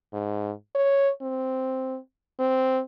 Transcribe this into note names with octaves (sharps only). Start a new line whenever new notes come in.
G#2
C#5
C4
C4